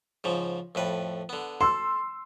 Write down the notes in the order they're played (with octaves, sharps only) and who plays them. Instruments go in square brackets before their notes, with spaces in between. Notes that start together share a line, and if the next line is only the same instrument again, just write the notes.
[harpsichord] G#2 C#3 F3
F2 A2 B4
D3 B3
[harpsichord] A4 [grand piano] C6 E6